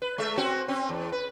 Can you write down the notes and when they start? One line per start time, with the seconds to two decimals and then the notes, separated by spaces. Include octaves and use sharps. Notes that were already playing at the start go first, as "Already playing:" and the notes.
0.02 B4
0.18 G#3 A3 E5
0.37 C4 C#4 F#4
0.68 C4 C#4
0.89 E2
1.12 B4